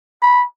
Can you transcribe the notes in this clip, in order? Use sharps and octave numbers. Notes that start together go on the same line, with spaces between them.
B5